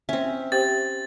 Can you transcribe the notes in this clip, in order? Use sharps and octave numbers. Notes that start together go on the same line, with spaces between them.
C4 C#4 E5
G4 C5 G5 A6